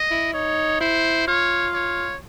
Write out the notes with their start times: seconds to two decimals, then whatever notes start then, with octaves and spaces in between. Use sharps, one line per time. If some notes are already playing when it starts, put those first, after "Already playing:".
Already playing: D#5
0.11 E4
0.33 D#4 C#5
0.80 E4 C5
1.27 F4 C#5
1.74 C#5